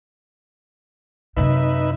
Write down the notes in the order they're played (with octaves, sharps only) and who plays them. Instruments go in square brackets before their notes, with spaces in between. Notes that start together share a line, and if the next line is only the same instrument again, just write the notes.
[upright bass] F#2 C3 [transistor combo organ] D#4 B4 E5